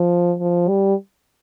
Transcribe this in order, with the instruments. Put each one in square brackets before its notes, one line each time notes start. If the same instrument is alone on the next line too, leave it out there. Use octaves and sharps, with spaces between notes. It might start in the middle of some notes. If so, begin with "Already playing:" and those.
Already playing: [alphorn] F3
F3
G3